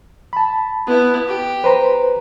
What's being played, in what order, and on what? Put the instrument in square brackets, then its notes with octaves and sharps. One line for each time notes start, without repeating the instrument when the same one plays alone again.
[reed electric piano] A5 B5
[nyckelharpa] B3 E4
G4
[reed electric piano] B4 C5 A#5